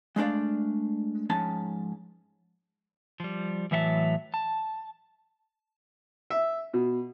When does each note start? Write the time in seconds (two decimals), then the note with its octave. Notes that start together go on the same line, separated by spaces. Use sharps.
0.16 G#3 A3 D4 D5 F5
1.30 G#2 F3 C#4 A5
3.20 F3 G3
3.71 A2 E3 F#3 E5 F5 A5
4.34 A5
6.30 E5
6.74 B2